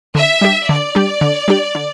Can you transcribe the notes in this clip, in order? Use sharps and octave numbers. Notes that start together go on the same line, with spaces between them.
D3 E5
G3 D4 G4
D3 D5
G3 D4 G4
D3
G3 D4 G4
D3